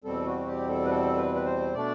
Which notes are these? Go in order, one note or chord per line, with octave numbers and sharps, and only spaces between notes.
E2 B2 G3 C4 A4
F#4
G4
A4
B4
A4
B4
B4
C5
B2 A3 D4 D5